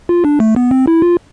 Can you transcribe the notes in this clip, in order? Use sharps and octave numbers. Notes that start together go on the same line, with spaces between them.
F4
D4
A3
B3
C4
E4
F4